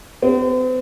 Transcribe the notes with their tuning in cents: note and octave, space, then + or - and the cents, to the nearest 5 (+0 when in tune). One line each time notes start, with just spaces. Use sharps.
C4 -45 G4 +25